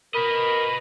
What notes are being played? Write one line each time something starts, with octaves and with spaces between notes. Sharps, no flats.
A#4 B4 D#5 B5